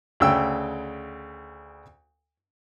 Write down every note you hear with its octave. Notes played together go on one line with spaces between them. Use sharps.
D2 C#3 G5 E6